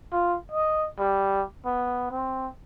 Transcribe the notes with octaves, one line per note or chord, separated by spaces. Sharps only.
F4
D#5
G3
B3
C4